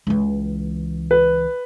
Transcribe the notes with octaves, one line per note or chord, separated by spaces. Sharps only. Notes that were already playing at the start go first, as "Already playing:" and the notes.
C#2 E3
B4